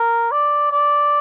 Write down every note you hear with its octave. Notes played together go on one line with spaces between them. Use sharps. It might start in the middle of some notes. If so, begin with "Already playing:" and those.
Already playing: A#4
D5
D5